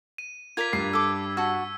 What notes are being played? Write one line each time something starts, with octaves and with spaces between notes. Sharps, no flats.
D#7
F4 A#4 D5 G#6 B6
G2 G3 C7
A4 D6 E6
F#4 A5 E6